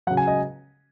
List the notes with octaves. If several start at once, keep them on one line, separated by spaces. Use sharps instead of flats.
C#3 F#3 F#5
G#5
D#5